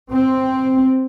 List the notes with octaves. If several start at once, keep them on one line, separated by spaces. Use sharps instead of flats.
C4